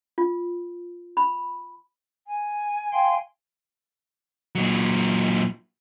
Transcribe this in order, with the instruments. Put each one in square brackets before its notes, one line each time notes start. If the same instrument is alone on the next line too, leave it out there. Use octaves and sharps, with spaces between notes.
[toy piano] F4
B5
[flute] G#5
[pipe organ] F5 G5 C6
[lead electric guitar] A#2 F#3